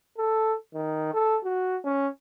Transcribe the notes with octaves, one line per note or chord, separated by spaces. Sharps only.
A4
D#3
A4
F#4
C#4